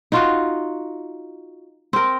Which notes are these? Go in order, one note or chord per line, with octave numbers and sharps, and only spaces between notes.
D#4 F4 F#4
C4 A#4